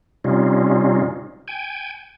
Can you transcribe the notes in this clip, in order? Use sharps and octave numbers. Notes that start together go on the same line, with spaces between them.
C3 G3 C#4 D#4 F4
G5 G#5